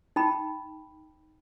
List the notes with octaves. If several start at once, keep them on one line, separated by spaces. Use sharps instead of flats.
D#4 G5 A5 B5